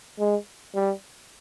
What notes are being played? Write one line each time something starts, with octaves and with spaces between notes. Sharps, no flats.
G#3
G3